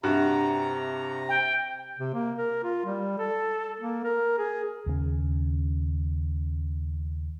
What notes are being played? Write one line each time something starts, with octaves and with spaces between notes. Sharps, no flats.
G2 C3 F#4 A#5
G5
C3
A#3
A#4
F4
G3
A4
A#3
A#4
G#4
D#2 C#3 B3 C#4